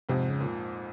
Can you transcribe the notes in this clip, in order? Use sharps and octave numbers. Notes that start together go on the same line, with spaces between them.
F2 G#2 C3
C#3
A#2